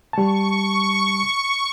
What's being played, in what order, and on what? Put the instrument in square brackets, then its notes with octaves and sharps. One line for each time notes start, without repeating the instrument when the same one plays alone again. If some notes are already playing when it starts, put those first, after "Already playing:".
[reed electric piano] G3 A5 [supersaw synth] C#6